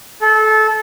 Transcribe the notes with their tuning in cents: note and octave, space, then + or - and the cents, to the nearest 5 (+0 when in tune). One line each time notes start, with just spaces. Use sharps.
A4 -25